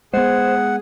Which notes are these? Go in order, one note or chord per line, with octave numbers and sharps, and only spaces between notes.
G#3 B3 G#4 C5 F#5